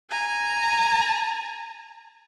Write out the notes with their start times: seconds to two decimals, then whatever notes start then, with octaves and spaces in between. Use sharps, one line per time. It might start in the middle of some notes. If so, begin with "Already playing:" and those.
0.10 G#5 A#5